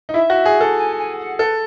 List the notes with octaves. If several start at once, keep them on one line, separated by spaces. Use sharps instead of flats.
D#4
E4 E5
F#4
G#4
A4
G#5
G#5
F#5
A4 B4